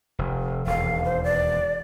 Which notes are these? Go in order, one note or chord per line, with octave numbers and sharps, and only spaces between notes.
F1
E1 D#2 F5
C5
D5